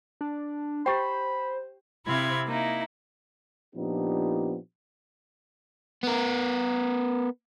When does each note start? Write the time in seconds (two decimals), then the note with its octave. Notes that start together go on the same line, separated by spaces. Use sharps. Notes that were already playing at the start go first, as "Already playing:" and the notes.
0.21 D4
0.86 E4 G4 C5 G5 B5
2.06 C3 C4 E4 F5 B5 G#6
2.46 A#3 D#4 E4
3.75 A#2 F3 B3 D4 D#4 G4
6.03 B3 A#4